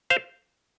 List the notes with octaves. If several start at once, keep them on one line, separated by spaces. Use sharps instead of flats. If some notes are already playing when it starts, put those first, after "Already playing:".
C5 F5